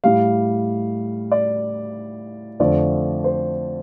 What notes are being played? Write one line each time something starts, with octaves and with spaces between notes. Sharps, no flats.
A2 G3 F5
D5
F2 D3 F3 A3 D5
C5